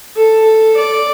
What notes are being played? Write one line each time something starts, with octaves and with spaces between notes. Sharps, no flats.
A4
D5